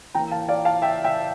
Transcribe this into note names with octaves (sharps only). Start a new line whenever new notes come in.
E3 A#3 G5 A#5
F5 A5
D5 F5
F5 A5
E5 G5
E5 G5